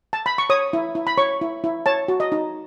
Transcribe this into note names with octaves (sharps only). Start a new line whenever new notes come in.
A5
B5
C#6
C#5 D#6
E4
E4
B5
C#5 C#6
E4
E4
C#5 A5
F#4
D#5
D#4